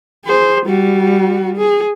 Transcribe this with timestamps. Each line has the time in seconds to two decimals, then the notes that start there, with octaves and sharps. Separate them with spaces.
0.25 G#4 C5
0.66 G3 F#4
1.57 G#4